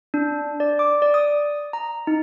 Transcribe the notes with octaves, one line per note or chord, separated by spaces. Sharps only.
D4
D5
D6
D5
D#6
A#5
D#4